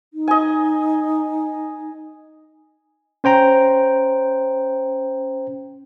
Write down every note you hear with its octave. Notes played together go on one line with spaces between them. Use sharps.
D#4
D#5 G#5
C#4 C5 G5 A#5